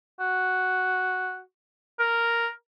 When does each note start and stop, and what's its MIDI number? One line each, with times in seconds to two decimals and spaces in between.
0.20 1.40 66
1.99 2.49 70